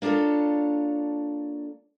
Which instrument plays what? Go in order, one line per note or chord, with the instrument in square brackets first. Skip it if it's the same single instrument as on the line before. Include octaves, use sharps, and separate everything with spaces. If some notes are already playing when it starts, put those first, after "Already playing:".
[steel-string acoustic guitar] A#3 D4 F4 A4 C#5